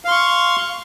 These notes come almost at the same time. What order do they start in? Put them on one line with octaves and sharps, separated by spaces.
F5 C6 C#6